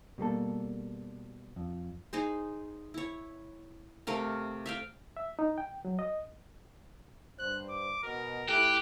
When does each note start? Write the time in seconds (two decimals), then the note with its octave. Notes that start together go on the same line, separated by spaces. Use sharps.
0.18 B2 G3 A#3 A4
1.56 F2
2.13 D#4 G#4 C5
2.94 E4 C#5
4.07 C3 A3 A#4 F5
4.66 E5 F5 G5
5.17 E5
5.39 D#4
5.58 G5
5.85 F#3
5.99 D#5
7.39 G2 C5 F#6
7.69 D6
8.03 B2 A#4
8.49 A3 E4 G4 A4 F#6